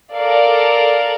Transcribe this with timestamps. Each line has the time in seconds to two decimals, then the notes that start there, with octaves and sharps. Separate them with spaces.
0.15 A4 A#4 D5 F5